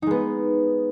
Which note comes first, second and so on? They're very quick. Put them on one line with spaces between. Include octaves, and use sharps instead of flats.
D#4 G#3 B3